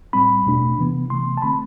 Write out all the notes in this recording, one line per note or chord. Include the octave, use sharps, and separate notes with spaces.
A2 G3 C4 B5
E2 B2 A3 D4
C3 E3 B3
C3 E3 A3 C6
A5
D3 A3 C4 B5